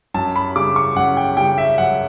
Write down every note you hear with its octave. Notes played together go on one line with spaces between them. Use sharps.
F#2 A5
B5
C#3 G3 D6
C#6
F#2 F#5
G5
C#3 G3 G5
E5
F#2 F#5